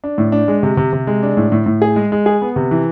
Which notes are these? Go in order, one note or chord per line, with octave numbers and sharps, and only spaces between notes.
D4
A2
D4
G#3
C3
C3
C3
G#3
D4
A2
A2
A2
G#4
G#3
G#3
G#4
B3
C3
E3